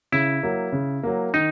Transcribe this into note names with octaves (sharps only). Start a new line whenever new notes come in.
C#3 E4
F#3 A#3
C#3
F#3 A#3
D#3 D#4